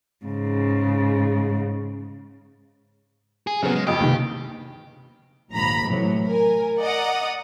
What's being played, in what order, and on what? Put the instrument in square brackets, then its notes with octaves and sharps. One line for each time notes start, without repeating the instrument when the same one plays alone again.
[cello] G#2 C#3
[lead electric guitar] G#4
[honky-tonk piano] C#3 B3 [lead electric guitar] F#3 C4
[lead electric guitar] G#3
[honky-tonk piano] F2 D#5 [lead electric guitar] G4
[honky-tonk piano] G2 D#3 [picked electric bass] C3 A#3
[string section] A#1 D#2 G#2 A#5 B5
A2 C3 E3 F#3
A#4 G#5
D5 D#5 F#5 A#5 D#6